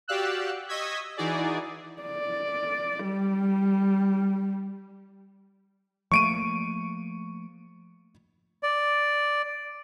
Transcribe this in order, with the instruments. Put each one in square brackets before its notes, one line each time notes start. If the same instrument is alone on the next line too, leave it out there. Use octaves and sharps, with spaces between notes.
[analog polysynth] F#4 G4 D5 F5 E6 F#6
D#5 C#6 E6 G#6 B6
E3 D#4 E4 F#4 G#4 D5
[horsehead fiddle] D5
G3
[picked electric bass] F3 A3 A#3 [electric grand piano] C#6 D7 D#7
[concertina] D5